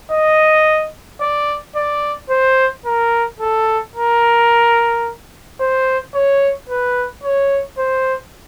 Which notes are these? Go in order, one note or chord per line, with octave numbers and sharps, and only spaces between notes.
D#5
D5
D5
C5
A#4
A4
A#4
C5
C#5
B4
C#5
C5